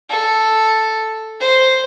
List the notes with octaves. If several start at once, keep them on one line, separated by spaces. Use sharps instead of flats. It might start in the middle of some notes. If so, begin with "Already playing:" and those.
A4
C5